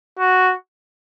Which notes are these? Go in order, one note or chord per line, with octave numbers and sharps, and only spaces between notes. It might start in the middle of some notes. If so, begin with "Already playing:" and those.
F#4